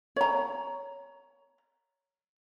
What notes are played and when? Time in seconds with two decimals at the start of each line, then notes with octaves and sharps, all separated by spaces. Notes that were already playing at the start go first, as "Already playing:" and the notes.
0.16 C#5 A#5